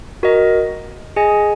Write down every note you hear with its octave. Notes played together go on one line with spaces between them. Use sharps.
F#4 A#4 D#5
G#4 D#5 G#5